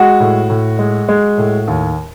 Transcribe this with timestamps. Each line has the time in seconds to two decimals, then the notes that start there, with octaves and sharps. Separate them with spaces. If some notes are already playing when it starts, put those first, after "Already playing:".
Already playing: G#3 F#4
0.20 A2
0.49 A2
0.79 G#3
1.09 G#3
1.38 A2
1.68 D#2